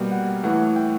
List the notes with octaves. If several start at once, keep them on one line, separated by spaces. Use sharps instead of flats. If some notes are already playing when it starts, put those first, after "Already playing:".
Already playing: B2 G3 A#3 G5
F#5
A2 E3 A3 F#5
G5